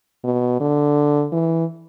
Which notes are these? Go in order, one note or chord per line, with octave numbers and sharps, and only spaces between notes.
B2
D3
E3